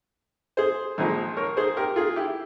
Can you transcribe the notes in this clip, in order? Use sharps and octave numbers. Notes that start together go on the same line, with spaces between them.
G#4 C5
A#1 A#2 F3 G#3
A#4 C#5
G#4 C5
G4 A#4
F4 G#4
E4 G4